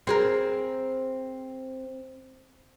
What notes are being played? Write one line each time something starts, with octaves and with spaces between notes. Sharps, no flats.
C4 G#4 A#4